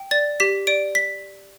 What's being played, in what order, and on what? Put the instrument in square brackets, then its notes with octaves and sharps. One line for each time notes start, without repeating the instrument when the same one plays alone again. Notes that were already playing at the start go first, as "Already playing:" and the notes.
Already playing: [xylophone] G5
D5 A6
G4 B6
D5 D7
B6